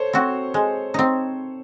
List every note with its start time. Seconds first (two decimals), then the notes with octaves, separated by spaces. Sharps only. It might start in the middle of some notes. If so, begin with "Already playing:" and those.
Already playing: A4 C5 C#5
0.13 C4 F#4
0.54 G#3
0.94 C4 D#4